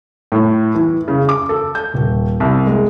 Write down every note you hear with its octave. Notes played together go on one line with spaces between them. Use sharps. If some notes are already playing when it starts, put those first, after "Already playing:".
A2
E3
C#3
D6
A4
G6
D#1
C2
G#3